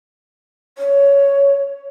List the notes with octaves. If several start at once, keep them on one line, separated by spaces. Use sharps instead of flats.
C#5